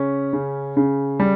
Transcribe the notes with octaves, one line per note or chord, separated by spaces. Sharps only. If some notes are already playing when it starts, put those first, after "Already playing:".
Already playing: C#3 C#4
C#3
C#3
G3